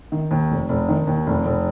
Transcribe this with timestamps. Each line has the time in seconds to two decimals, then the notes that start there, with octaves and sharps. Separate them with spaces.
0.12 D#3
0.31 D#2
0.50 F1
0.69 F1
0.89 D#3
1.07 D#2
1.27 F1
1.45 F1